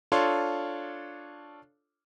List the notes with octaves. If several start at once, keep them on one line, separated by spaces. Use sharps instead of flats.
D4 F4 A4 C#5 C6